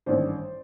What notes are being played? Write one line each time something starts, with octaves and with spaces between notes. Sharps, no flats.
A1 G2 D#3 C5 D5